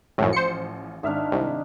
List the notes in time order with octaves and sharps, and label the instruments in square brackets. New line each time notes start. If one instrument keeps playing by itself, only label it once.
[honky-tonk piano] A1 F3 [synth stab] F#2 A2
[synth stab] C5 C#7
[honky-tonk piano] G#1 E5 F6 [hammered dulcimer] D4 D#4
[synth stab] C2